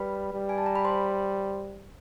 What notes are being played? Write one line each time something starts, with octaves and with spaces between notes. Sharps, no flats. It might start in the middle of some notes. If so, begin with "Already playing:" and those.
Already playing: G3 B4 B5
G3
G#5
A5
A#5
B5
C5 C6